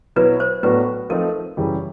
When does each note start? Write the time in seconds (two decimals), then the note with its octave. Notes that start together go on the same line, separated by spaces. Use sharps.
0.16 B2 F#3 B3 E4 B4
0.40 C5
0.63 A2 F#3 B3 D4 F#4 B4
1.10 F3 A3 C4 D#4 A#4
1.57 F#2 C#3 E3 G3